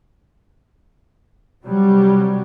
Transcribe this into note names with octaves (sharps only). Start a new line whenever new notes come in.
C3 F#3 G3